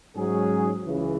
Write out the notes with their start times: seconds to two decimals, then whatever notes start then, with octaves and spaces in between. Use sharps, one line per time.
0.15 G#2 F#3 C#4 G#4
0.86 C#2 C#3 E3